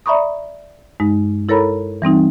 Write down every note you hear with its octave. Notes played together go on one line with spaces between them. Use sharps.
D5 E5 A#5 B5 C#6 D#6
G2 G#3 D#4
E4 A4 A#4 C#5 A#5 B5
E3 G3 C4 D#4